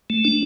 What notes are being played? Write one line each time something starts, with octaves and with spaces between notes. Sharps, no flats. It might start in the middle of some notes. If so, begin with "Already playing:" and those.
A3
D4